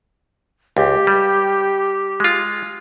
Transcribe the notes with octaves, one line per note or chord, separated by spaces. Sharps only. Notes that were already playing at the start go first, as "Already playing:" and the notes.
C#2 G4
G3
G#3 F4